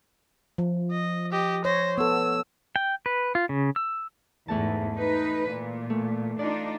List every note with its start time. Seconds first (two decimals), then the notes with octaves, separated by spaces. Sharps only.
0.58 F3
0.91 D#5
1.32 G4 D#5
1.65 C5 C#5 A#6
1.98 B3 A4 E6
2.76 G5
3.06 B4
3.35 F4
3.49 C#3
3.76 E6
4.48 E2 G#2 E3 A3 A5
4.95 D#4 B4
5.50 A#2
5.90 A3
6.39 D4 D#4 F4 D5